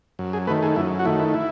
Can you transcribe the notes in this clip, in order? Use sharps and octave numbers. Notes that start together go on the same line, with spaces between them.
F#2
G#4
D#3 A3 B4
G#4
F#2 E4
F#4
D#3 A3 E4
E4
E4